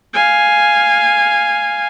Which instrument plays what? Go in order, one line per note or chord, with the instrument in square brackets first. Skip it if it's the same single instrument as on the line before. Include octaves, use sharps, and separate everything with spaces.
[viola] F5 G#5